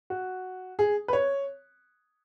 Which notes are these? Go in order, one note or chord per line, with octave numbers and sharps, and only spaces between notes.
F#4
G#4
B4
C#5